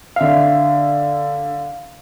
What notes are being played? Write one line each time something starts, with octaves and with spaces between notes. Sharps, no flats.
D3 E5 F5